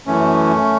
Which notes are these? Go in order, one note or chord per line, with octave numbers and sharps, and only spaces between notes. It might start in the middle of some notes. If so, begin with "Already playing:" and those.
F#2 E3 A3 C#4